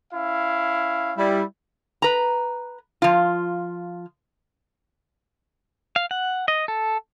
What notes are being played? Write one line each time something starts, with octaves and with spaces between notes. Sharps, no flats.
C#4 E4 F5
G3 E4
B4 A#5
F3 F4
F5
F#5
D#5
A4